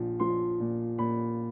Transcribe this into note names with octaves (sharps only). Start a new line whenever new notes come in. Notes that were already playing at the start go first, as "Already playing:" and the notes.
Already playing: A#1 F3
F3 C6
A#2
A#2 B5